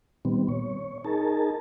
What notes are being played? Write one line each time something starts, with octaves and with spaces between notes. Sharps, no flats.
A#2 D#3 G3 B3 C4
C#5
D#4 G#4 A#4 A5